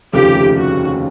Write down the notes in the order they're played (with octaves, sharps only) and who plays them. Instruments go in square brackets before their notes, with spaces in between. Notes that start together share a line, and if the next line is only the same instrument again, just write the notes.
[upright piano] F1 D#2 C#3 F3 A3 [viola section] G4
[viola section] F#4